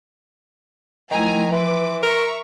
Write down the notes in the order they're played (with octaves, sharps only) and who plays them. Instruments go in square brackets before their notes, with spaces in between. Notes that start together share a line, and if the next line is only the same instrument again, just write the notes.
[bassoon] D#3 [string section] F3 G#5 A#5 [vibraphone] F#3 A3 E4
[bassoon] E3 [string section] B4 D6 [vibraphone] C6
[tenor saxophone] A#4 [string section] E5 A#5 C#6